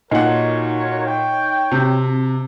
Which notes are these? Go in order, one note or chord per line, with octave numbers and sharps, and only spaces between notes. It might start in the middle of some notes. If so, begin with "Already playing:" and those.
A#2 D#4 F#4 A#4 C#5 D#5 F#5
C#5 G5
C3 C4